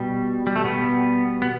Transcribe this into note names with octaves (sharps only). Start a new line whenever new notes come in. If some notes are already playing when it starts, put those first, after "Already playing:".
Already playing: B2 G3
G3
A3
B2 G3 B3
B3